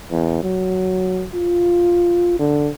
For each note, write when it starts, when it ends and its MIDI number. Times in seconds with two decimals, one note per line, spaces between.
0.11 0.42 40
0.44 1.25 54
1.34 2.37 65
2.39 2.69 50